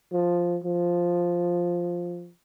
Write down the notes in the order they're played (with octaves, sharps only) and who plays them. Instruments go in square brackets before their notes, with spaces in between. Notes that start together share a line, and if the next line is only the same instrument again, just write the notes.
[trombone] F3
F3